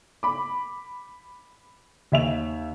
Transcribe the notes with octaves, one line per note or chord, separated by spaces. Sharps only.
B5 D6
D#2 E5 F7